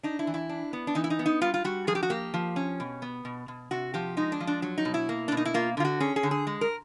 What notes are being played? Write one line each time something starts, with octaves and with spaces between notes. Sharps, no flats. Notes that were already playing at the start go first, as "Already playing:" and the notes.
D4 D#4
E4
E3
E4
D4
B3
D4
E3 D#4
E4
D#4
B3
D#4
G3 F4
F4
G3 F#4
F3 G#4
G4
F#4
A#3 G4
F3
C#4
B2
B3
B2
B2
C3 F#4
F3 G4
G#3 D#4
D4
F3
D4
F#3
D#4
B2
E4
A#3
D4
B2
D#4
E4
A#3 F4
D3 F4
F#4
C#4 G#4
G#4
D3
G#4
G#3
A#4